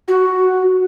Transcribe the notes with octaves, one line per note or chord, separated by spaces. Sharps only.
F#4